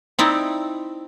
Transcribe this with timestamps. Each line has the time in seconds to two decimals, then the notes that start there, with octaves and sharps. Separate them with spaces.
0.19 C4 D#4 E4 D5